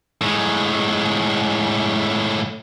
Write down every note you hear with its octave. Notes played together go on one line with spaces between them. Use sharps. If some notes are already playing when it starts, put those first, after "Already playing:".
A2 G#3